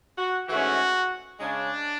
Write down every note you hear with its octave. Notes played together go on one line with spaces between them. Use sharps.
F#4
G#2 E3 A3 C#4 F#4
C#3 G#3 C#4 D4